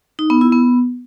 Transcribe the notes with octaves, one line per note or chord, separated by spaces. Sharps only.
D#4
B3
E4
B3